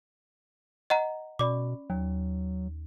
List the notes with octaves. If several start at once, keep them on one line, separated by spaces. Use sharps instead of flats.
D#5 F#5 A#5
B2 C#4 D5 B5 D6
D#2 F#3